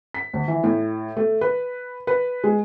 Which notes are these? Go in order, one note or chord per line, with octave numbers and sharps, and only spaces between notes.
B6
D2
E3
A2
A3
B4
B4
G#3